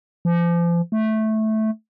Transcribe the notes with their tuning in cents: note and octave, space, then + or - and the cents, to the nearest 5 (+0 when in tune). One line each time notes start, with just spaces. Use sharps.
F3 -35
A3 -10